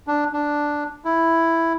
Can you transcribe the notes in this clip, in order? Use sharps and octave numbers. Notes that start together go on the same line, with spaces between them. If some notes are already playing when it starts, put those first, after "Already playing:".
D4
D4
E4